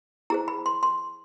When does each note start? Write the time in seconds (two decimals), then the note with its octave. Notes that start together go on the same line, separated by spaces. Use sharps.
0.30 E4 G#4 C5 A#5
0.48 B5
0.66 C6
0.83 C6